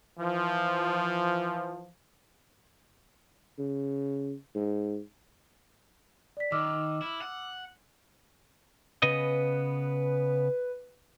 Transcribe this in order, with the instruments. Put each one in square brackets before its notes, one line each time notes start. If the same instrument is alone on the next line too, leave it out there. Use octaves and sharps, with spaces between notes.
[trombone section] E3 F3
[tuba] C#3
G#2
[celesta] D5 B6
[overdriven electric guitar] D#3 [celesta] D6 E6 F6
[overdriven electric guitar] E4
F#5
[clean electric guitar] C#3 B3 D#5 [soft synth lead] B4